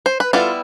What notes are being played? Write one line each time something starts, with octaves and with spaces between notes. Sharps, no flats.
C5
B4
G3 B3 E4 F4 A4